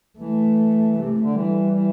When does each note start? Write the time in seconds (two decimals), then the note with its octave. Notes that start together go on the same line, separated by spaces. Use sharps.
0.19 E3 A3
0.96 C3 A3
1.22 D3
1.34 E3 G3
1.73 E3